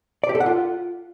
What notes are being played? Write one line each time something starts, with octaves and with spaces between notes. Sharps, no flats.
D5
G4
A4
F#5
F4